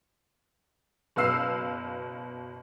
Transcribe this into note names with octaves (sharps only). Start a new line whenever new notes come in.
F#1 B2 B4 F5 E6 C7